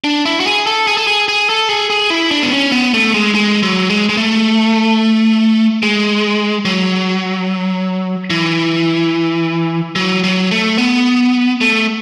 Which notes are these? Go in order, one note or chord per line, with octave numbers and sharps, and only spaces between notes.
D4
E4
F#4
G#4
A4
G#4
A4
G#4
G#4
A4
G#4
G#4
E4
D4
B3
C#4
B3
A3
G#3
G#3
F#3
G#3
G#3
A3
G#3
F#3
E3
F#3
F#3
A3
B3
A3